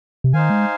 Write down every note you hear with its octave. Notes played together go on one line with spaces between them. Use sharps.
C3
D#3 D#4 C5 F5 G#5
G#3